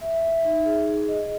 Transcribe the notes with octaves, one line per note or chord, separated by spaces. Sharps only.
E5
E5
D#4
G#4
G#4
D#5